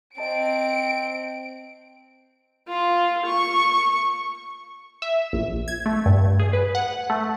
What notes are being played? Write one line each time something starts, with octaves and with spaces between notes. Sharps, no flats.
C4 D#5 A5 D7
F4
C#6
E5
A#1
G#6
A3
G2
G#4
B4
F#5
A3